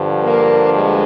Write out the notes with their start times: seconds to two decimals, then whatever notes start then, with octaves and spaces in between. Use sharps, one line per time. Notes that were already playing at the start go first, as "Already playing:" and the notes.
Already playing: G2 D3 F3
0.22 A#3
0.72 G#3